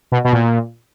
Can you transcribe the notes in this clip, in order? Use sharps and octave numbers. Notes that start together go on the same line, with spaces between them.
B2
B2
A#2